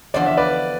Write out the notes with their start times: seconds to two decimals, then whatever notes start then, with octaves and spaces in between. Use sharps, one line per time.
0.14 E2 D3 F3 D5
0.26 E5
0.37 B4 D5